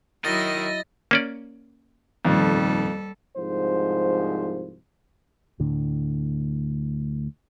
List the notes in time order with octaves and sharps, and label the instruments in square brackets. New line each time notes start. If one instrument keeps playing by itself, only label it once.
[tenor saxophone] D#3 [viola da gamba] F#3 E4 [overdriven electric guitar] D#5 [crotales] A6 A#6
[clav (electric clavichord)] A#3 C#4 D5
[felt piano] D#1 D#3 [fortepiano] F2 [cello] G3 A4
[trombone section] C2 G#2 F3 C5
[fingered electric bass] D2 A2 D3